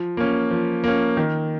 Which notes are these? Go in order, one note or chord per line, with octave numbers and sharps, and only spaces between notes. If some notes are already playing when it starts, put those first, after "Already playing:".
Already playing: F3
A#3 C#4
F3
A#3 C#4
D#3